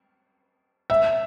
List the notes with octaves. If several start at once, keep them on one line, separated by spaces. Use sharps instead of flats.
E5